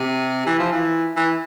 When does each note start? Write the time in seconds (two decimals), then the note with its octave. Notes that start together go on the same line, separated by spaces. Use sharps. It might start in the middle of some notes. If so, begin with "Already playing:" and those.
Already playing: C3
0.46 E3
0.59 F3
0.72 E3
1.17 E3